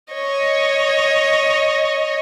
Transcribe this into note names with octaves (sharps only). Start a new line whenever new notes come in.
C#5 D#5